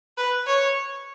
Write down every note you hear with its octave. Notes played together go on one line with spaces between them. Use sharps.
B4
C#5